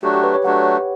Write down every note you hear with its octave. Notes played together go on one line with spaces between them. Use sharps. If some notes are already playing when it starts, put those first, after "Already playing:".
F#3 A3 D4 F#4 G4
G4
B4
C#5
F#3 A3 D4 F#4 F#5